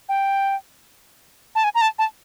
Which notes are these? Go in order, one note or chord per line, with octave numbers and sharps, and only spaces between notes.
G5
A5
G#5
A#5
A5
A5